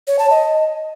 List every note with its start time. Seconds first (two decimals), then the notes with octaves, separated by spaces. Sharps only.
0.07 C#5
0.19 A5
0.30 D#5